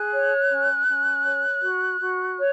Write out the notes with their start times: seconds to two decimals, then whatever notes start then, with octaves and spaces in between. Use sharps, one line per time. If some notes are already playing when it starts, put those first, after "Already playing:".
Already playing: G#4 F#6
0.12 C#5
0.50 C#4
0.87 C#4
1.25 C#5
1.62 F#4
2.00 F#4
2.37 C#5